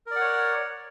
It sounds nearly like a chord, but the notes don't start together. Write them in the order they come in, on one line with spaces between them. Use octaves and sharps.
A#4 D5 F#5 C#5